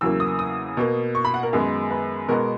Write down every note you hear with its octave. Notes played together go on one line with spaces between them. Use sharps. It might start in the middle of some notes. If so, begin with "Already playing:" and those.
E2 C#3 F#3 A#3 E6
D#6
D#6
B2 A#3
C#6
B5
F#5
A#4
F#2 D#3 G#3 B3
B4
B2 G#3 B3 A#4